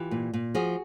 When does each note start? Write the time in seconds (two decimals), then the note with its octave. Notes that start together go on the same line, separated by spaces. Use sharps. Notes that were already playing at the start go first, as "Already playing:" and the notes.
Already playing: E3 F4 G4
0.11 A#2
0.34 A#2
0.54 F3 F#4 G#4